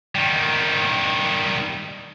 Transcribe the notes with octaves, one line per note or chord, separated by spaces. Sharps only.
D#3 G3